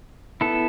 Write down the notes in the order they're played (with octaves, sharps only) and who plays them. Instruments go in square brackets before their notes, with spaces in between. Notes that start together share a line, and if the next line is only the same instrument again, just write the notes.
[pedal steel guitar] B3 E4 A4